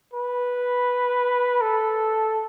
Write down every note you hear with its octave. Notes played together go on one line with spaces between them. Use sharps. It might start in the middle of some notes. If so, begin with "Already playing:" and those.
B4
A4